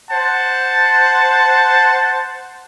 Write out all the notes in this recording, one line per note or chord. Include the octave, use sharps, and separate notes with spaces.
C5 F#5 A5